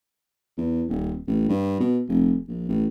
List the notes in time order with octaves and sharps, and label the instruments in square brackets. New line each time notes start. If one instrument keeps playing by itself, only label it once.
[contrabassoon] E2
D#1
A1
G2
B2
F1
A#1
A1